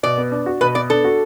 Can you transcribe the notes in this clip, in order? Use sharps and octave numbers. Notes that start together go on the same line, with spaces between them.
B2 D5
B3
D4
F#4
B2 B4
B3 D5
D4 A4
F#4